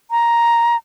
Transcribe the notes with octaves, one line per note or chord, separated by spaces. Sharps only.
A#5